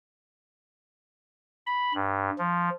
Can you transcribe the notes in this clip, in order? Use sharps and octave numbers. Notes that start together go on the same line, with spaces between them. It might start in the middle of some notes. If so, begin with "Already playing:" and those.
B5
G2
F3